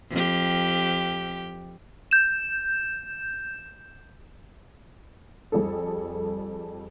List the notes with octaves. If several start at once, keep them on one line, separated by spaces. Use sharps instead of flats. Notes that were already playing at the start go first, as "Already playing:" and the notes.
F2 G4
G6 E7
F2 G3 G#4 A4